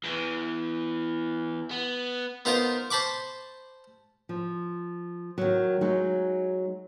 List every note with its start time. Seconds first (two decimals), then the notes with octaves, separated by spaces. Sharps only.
0.04 E2 E3
1.71 B3
2.45 B3 D#4 F4 A#4 C5
2.90 C5 A5 B5 C#6 D6
4.29 F3
5.38 D#3 F#3
5.81 F#3 G#3 D#4